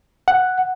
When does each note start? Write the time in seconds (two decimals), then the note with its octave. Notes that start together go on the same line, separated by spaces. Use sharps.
0.28 F#5